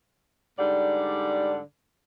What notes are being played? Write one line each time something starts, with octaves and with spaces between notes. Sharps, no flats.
G#2 D3 G3 D5